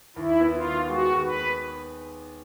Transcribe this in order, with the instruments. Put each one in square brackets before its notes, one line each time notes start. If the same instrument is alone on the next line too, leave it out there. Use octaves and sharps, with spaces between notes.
[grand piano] D#2 [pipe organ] E4
[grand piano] B3
[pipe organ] F4
[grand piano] D#3
[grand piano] G#3 [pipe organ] F#4
[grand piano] D#2
[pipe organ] B4
[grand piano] B3